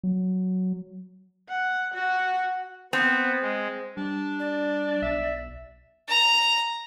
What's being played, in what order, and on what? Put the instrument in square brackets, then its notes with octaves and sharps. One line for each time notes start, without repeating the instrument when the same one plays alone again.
[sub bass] F#3
[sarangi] F#5
F#4
[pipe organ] B3 [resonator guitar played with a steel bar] C4
[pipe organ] G#3
[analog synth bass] G3 [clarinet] D4
[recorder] D5
[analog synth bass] B1 [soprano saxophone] E5
[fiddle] A#5